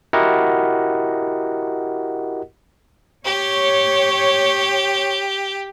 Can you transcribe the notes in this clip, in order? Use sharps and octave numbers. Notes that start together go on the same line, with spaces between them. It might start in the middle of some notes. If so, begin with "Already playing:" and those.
E4 F#4 G4 A#4 D#5 F#5
G4 C#5